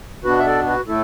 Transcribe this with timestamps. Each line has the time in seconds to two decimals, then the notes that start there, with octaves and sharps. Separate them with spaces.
0.24 B2 B3 D4 F#4 B4
0.39 E5
0.46 A4 D5
0.66 F#4 B4
0.87 A2 A3 E4 A4